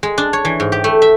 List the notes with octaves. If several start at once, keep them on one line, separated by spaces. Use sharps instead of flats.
G#3
D4
C#5
E3
G#2
G4
A3
E5